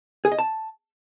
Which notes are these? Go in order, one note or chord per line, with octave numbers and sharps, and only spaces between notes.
G#4
D#5
A5